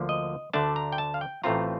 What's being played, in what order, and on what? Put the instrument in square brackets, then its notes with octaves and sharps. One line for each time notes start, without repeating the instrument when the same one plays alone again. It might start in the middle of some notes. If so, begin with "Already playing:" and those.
Already playing: [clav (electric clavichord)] D2 D3 F3 A#3 D4
D#5
D2 D3 A3 D4 A5
A#5
G5
A5
F5
G5
A1 A2 A3 C4 F4 A#5